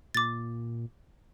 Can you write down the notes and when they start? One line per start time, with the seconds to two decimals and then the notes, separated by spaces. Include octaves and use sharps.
0.15 A#2 D6 A6